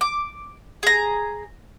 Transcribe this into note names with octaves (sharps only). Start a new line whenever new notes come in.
D6
G#4 A#5